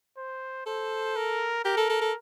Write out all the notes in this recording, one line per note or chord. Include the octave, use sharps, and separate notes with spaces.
C5
A4 C5
A#4
G4 A#4
A4
A4
A4